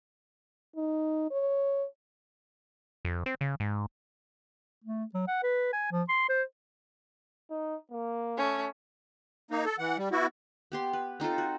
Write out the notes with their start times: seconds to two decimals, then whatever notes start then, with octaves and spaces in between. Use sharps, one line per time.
0.76 D#4
1.31 C#5
3.05 F2
3.26 C4
3.41 C#3
3.60 G#2
4.84 A3
5.14 F#3
5.28 F#5
5.43 B4
5.73 G#5
5.92 F3
6.09 C6
6.29 C5
7.50 D#4
7.92 A#3
8.37 A3 C#4
9.51 A#3 D#4
9.65 A4
9.79 E3 F#5
9.98 G3
10.12 B3 E4 F#4
10.72 B3 G4 C6
10.93 B4
11.20 C4 D#4 F4 A4
11.38 F#4